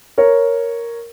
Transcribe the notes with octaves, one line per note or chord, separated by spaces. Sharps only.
A#4 C#5